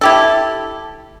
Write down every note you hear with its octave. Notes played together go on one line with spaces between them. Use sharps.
E4 G4 A4